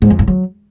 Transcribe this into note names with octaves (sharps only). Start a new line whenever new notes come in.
G#2
F2
G2
F#3